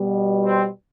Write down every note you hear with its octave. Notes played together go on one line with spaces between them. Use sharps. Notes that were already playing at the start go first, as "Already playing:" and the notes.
Already playing: B2 G3
C4